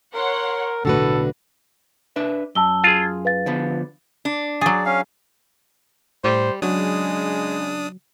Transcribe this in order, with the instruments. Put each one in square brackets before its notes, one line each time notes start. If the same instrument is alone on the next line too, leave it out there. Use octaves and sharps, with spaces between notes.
[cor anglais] A#4 [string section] C#5 F#5 C6
[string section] B1 A2 [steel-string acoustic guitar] D3 F#4 B4 [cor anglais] A4
[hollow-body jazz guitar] D4 B4 E5
[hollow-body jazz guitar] F#2 [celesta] A5 E6 G7
[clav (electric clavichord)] F4 G#4
[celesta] B4 F5 A6
[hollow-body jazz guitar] D3 F3 B3
[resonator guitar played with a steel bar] D4
[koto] F#3 G#4 [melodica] D5
[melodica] C#4 F5
[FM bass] A2 [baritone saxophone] G3 [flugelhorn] C5
[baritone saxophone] C#3 [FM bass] F#3 [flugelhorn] G#3 [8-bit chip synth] D4 D#6